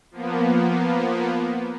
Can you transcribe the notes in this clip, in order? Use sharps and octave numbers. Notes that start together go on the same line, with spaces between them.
F3 A#3 B3